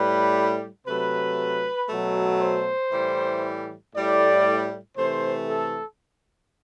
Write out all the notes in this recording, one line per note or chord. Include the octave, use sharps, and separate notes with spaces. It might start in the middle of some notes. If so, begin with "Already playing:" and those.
Already playing: A2 G3 B4
C3 F#3 A3 B4
B2 F#3 A3
C5
A2 E3 G3
A2 G3 D5
C3 E3 A3 C5
A4